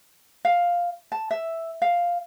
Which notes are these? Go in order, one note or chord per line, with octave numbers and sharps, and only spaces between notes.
F5
A5
E5
F5